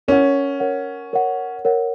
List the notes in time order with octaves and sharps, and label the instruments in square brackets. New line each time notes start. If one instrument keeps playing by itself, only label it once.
[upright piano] C#4 [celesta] A#4 C#5 F#5
[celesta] A#4 C#5 F#5
A#4 C#5 F#5
A#4 C#5 F#5